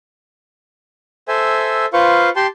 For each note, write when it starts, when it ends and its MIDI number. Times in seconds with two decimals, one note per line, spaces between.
1.28 1.86 69
1.28 1.86 72
1.28 1.86 76
1.28 1.86 80
1.93 2.29 65
1.93 2.29 71
1.93 2.29 72
1.93 2.29 77
1.93 2.29 85
2.36 2.47 67
2.36 2.47 79
2.36 2.47 81
2.36 2.47 84